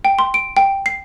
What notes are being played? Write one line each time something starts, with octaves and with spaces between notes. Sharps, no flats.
G5
C6
D7
G5
C7